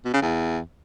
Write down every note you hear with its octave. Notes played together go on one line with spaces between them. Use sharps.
B2
C#3
E2